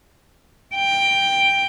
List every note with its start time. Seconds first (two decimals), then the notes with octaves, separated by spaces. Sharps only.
0.75 G5